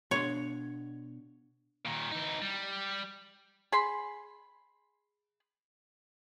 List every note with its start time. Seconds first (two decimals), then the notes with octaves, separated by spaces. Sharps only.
0.11 B2 D4 C#5 C6
1.86 A#2 D#3
2.12 E3 D#4
2.42 G3
3.72 G#4 B5 C6